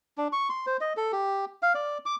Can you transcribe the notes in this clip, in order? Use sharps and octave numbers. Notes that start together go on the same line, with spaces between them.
D4
C#6
C6
C5
D#5
A4
G4
F5
D5
D6